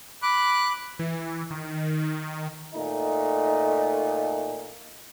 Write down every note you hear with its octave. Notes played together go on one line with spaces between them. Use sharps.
B5 D6 F#6
E3
D#3
A#2 A3 D#4